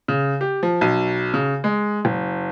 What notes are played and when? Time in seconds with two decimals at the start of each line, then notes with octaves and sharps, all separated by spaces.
0.08 C#3
0.41 G4
0.63 F3
0.81 B1
1.34 C#3
1.64 G#3
2.05 F#1